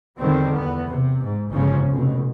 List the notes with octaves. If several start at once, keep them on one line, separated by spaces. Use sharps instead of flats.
E2 D3 D#3 G3 C4
E2 B3
C3
G#2
G1 G#2 C#3 F3 C#4
F1 B2